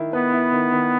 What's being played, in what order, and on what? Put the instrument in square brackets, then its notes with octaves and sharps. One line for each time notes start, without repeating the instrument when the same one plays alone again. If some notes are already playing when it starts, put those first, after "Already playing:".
Already playing: [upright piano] D#3 E4
[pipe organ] B3 [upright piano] B4
[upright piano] E4
D#3
D#3